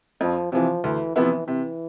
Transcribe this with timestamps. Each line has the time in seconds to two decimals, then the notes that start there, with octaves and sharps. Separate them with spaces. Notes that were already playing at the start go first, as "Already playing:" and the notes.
0.21 F2 F3
0.52 C3 E3 F3
0.84 D2 E3
1.16 C3 E3 F3 B3 E4
1.47 C3 E3